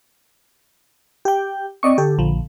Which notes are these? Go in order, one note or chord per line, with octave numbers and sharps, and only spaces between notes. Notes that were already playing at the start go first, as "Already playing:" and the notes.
G4 G5
C4 D5 D#5 C#6
D3 G4 A4
A#1 F3